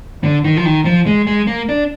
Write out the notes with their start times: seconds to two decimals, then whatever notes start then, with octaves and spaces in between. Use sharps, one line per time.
0.23 D3
0.44 D#3
0.57 F3
0.65 D#3
0.85 F3
1.06 G#3
1.27 G#3
1.47 A#3
1.69 D4